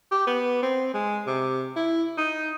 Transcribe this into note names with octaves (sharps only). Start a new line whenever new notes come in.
G4
B3
C4
G#3
C3
E4
D#4